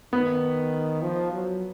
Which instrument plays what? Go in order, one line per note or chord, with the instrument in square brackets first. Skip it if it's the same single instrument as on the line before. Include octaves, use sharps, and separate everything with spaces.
[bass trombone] D#3 [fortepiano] B3
[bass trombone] F3
F#3